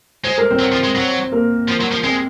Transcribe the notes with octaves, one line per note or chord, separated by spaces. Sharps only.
G#3 C5
A#4
C4 C5
F#3
F3
G#3
F#3
A#3 A#4
F3
F#3
F3
G#3 C4 C5